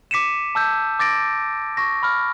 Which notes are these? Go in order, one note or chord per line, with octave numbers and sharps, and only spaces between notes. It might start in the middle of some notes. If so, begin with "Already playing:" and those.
D6 B6 C#7 D#7 E7
A5 E6 G6
D6 A6 A#6 D7
C#6 A#6
B5 F6